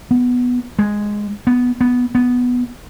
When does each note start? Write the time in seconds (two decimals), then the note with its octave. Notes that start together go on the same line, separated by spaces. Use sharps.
0.11 B3
0.79 G#3
1.47 B3
1.81 B3
2.15 B3